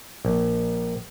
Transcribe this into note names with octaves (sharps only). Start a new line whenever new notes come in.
A#1